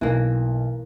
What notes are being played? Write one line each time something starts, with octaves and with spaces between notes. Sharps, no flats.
B1 E3 A#3